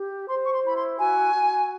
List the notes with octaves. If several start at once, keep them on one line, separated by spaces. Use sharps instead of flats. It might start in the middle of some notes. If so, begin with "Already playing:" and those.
Already playing: G4
C5 C6
C#6
C6
E4 B5
C6
F#4 G#5
F#4